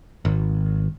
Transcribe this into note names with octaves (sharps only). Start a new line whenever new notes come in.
G#1